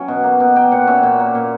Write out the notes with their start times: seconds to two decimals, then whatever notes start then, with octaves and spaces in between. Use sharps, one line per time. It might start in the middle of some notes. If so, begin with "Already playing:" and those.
Already playing: F#3 C#4 E5 G5
0.08 B2
0.24 A#3
0.40 B2
0.56 A#3 G5
0.72 A#2 F#5
0.87 C#4 E5
1.03 A#2
1.20 A#3
1.35 A#2